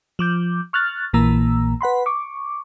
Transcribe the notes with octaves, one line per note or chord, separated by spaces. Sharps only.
F3 D6 G6
C#6 F6 F#6 A6
A#1 A#2 E3 A#3 A#5 E6
B4 F#5 B5 C6
C#6 D6